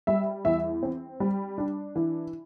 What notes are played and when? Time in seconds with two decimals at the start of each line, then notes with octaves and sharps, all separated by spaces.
0.07 G3 E5
0.45 E2 E5
0.83 C4
1.20 G3
1.58 D4
1.96 E3